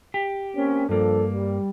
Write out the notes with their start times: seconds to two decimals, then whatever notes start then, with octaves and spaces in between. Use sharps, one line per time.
0.14 G4
0.57 A#3 C4 C#4
0.89 G2 F3 A#3 D4 A4
1.33 G3